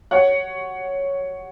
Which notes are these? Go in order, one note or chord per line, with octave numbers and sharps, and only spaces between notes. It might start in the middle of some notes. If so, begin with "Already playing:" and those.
C#5 F#5